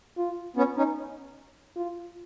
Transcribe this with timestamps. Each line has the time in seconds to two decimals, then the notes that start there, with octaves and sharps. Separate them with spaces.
0.18 F4
0.56 B3 C#4
0.76 C#4 D#4
1.76 F4